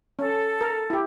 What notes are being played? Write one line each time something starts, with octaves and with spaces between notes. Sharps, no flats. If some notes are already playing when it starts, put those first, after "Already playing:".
C#4 A4
A#4
E4 G4